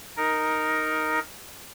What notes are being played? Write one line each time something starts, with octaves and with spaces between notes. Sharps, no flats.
D#4 A#4